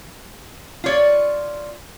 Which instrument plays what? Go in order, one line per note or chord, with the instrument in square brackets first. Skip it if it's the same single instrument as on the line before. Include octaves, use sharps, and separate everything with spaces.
[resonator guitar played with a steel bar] F4 C#5 D5